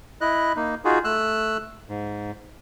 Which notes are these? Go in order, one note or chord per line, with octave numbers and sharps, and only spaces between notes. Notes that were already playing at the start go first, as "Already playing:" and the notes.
E4 D#5 F#6
A#3 D#4
D#4 F4 F#4 G#4
A3 E6 F#6
G#2